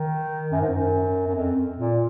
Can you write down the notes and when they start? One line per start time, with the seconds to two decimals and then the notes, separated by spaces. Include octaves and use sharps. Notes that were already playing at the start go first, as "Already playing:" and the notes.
Already playing: D#3
0.52 F#2
0.61 G#2
0.70 F#2
1.27 F#2
1.36 F2
1.78 A#2